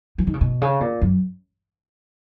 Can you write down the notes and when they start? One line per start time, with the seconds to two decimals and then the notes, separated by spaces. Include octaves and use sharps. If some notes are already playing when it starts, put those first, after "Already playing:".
0.18 F3
0.27 D#3
0.34 C#3
0.41 B2
0.62 C#3
0.81 A#2
1.01 F#2